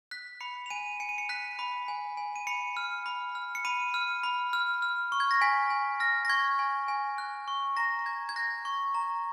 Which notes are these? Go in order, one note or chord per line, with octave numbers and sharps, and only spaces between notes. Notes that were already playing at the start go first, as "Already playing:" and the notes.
F#6 B6
B5 C#7
F7
G#5 D#7
G#5 C#7
D#7
C#7
F#6 B6
B5
G#5
G#5
D#7
B5 C#7
F6
B5
F6
C#7
B5 D#7
F6
B5
F6
F6
C#6
G#6
A#6
G#5 B6
G#5
F6 A#6
A#6
C#6 G#6
G#5
G#5
F#6
C#6
A#5 A#6
A#6
A#5 G#6
G#6
F#6 A#6
C#6
A#5